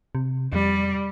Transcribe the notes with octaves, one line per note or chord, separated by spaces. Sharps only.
C3
F2 G3